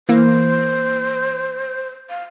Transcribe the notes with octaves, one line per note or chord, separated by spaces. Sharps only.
E3 A#3 C5
F5